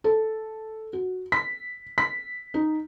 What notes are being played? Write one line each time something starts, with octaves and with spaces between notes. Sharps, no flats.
A4
F#4
B6
B6
D#4